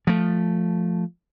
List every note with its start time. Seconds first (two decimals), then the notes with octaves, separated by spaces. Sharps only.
0.07 F3 A3